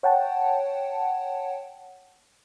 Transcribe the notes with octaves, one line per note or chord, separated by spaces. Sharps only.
C#5 F#5 G5 A5